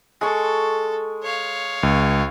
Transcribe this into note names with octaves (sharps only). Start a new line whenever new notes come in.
G#3 A4 C#6
C#5 F5
C#2